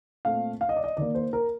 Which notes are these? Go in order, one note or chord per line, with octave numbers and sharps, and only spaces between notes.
A#2 A3 C4 F5
F5
D#5
D5
D#5
D#3 A#3 D5
C5
A#4